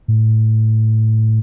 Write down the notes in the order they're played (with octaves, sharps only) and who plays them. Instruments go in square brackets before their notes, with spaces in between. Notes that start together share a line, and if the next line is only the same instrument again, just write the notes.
[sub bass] A2